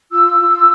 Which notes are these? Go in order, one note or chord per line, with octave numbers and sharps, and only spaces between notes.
F4 E6
F4